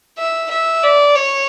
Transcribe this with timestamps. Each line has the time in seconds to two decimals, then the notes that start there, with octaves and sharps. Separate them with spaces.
0.18 E5
0.51 E5
0.83 D5
1.15 C#5